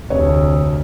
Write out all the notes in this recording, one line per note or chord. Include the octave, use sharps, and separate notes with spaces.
F1 D2 C#5